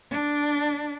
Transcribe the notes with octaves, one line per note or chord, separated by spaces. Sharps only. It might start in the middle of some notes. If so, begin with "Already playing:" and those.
D4